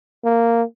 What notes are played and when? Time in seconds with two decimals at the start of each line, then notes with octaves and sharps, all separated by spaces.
0.24 A#3